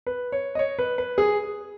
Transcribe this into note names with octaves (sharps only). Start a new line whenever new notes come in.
B4
C#5
D#5
C#5
B4
B4
G#4